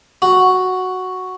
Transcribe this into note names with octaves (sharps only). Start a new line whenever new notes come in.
F#4